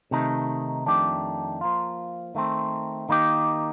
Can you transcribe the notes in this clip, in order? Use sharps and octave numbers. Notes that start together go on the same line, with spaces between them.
C3 D#3 A3 D#4
F2 D#3 A3 D4 G4
F3 A#3 F4
D#3 A3 C4
D#3 A#3 D#4 G4